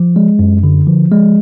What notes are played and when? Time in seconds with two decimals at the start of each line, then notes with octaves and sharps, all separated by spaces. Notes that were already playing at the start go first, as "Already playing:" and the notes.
Already playing: F3
0.16 G#3
0.39 F#2
0.63 D3
0.87 F3
1.12 G#3